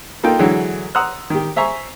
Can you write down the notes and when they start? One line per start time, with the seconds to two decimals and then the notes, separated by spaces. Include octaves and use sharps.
0.23 A#3 D#4 F4 A4 G5
0.39 D3 E3 F#3 G#3 E4
0.95 F#5 A#5 C6 D#6 E6 F#6
1.30 D#3 G4
1.56 C5 E5 G#5 A#5 C#6